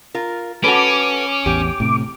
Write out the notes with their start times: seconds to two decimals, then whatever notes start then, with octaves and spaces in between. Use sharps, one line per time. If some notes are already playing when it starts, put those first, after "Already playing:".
0.14 F4 A#4
0.64 C#4 F#4 A4 B4 D6
1.46 A1 E2 G4
1.80 A2 C3